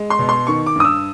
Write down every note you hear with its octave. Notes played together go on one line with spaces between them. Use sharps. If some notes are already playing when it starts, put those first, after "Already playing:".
Already playing: G#3
C6
B2
C6
D#3 C#6
D6
G2 D#6
E6